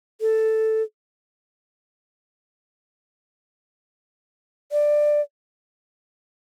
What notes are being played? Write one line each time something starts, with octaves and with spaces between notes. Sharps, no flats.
A4
D5